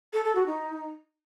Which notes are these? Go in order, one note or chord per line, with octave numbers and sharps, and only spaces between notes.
A4
A4
F#4
D#4